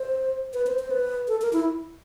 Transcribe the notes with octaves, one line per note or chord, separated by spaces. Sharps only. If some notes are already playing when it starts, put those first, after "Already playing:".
Already playing: C5
B4
C5
C5
B4
A4
A#4
E4